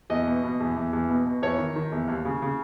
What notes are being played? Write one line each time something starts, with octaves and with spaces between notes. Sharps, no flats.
E2 D#5
B2
B2
E2
E2
E2
B2
B2
E2 C#5
D#3
D#3
E2
D#2
C#3
C#3